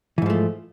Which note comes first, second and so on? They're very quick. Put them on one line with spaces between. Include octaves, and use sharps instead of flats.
E3 G#2 F3 A3